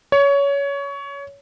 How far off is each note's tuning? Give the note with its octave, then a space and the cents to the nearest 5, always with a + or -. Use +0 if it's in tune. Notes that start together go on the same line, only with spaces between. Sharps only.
C#5 +20